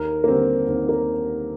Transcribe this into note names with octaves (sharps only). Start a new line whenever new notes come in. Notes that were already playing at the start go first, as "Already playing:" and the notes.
Already playing: D#2 A#4
A#3
D3 G3 C4
D#2 C4
A#3